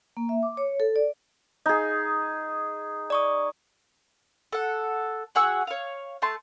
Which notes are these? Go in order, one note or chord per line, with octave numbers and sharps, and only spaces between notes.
A#3
E5
D6
C#5
A4
D5
D#4 G#4
D5 C#6 D#6
A4 F#5
F#4 G#4 F#5 E6
C#5 F5
A3 A5 C6